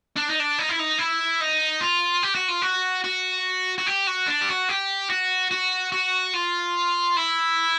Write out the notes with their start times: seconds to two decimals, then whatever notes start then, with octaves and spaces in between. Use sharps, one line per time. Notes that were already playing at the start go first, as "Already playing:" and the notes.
0.16 D4
0.29 D#4
0.39 D4
0.58 D#4
0.69 E4
0.79 D#4
0.98 E4
1.40 D#4
1.81 F4
2.23 G4
2.35 F#4
2.48 F4
2.62 F#4
3.04 F#4
3.78 F#4
3.87 G4
4.07 F#4
4.28 D4
4.42 G4
4.49 F#4
4.69 G4
5.10 F#4
5.51 F#4
5.92 F#4
6.34 F4
7.17 E4